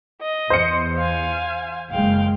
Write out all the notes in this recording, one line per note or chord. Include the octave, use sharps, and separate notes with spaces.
D#5
E2 C5 C#7
F5 G#5
F#1 G#3 F5 G5